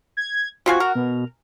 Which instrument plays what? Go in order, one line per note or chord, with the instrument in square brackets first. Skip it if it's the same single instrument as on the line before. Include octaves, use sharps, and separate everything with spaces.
[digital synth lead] G#6
[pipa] C3 F4 G#5 [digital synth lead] F#4
[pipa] A#4
[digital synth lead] B2